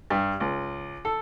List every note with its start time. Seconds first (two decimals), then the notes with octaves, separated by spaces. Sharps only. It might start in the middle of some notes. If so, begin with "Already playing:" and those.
0.10 G2
0.40 C#2
1.05 A4